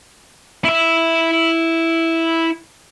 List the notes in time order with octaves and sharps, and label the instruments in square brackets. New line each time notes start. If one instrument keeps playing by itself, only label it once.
[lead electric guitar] E4 E5